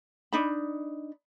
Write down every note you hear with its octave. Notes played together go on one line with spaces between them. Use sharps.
D4 D#4 B5